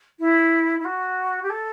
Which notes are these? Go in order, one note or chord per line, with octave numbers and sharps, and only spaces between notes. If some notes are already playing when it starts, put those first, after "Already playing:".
E4
E4
F#4
G4
A4